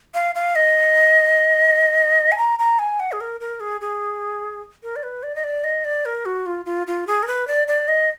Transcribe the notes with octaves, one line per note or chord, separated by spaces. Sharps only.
F5
F5
D#5
G#5
A#5
A#5
G#5
F#5
G#4
A#4
A#4
G#4
G#4
A#4
D5
B4
D5
D#5
D5
D#5
D5
A#4
F#4
F4
F4
F4
G#4
A#4
B4
D5
D5
D#5